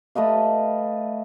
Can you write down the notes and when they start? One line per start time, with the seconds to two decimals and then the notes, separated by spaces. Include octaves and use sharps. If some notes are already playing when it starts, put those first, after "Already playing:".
0.15 A3 B4 D#5 F5